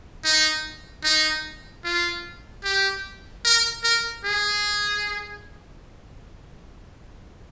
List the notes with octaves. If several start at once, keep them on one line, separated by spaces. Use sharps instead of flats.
D#4
D#4
F4
G4
A#4
A#4
G#4